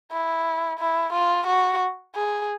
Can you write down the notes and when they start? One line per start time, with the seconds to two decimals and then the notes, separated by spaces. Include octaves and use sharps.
0.12 E4
0.80 E4
1.13 F4
1.47 F#4
2.15 G#4